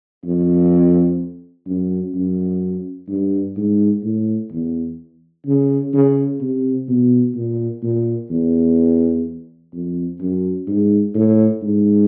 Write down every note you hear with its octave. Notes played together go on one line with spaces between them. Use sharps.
F2
F#2
F#2
G2
G#2
A2
E2
C#3
C#3
C3
B2
A#2
A#2
E2
F2
F#2
G#2
A2
G#2